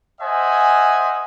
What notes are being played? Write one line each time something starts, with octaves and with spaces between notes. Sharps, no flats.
C5 D#5 E5 F#5 G#5